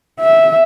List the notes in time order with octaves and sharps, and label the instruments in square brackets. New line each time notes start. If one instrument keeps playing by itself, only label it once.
[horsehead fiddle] E5